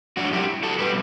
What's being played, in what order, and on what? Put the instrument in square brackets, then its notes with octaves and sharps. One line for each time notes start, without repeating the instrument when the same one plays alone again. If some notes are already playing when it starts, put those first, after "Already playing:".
[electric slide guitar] F#2 F#3 D4 F#4
E4 G4
F#4 A4
B2 G3 G4 B4